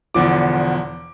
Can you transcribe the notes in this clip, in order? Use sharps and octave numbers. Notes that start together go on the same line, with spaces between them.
E1 E2 D3 F3 D6